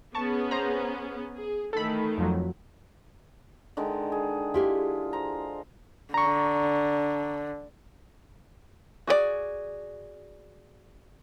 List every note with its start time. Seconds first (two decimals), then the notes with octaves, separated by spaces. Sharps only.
0.15 B3 C#4 G#4 A5 C#6
0.51 C5 A#5
1.35 G#4
1.73 D#3 E3 A3 A4 B5
2.18 F2 F3 F#3
3.77 D3 D#3 G#3
4.12 G#4
4.54 E4 F4 G4 G#4
5.13 C5 A#5
6.14 D3 A#5 C#6
9.07 F#4 G#4 A4 D5